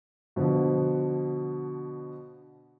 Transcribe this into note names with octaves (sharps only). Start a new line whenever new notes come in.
B2 D3 F3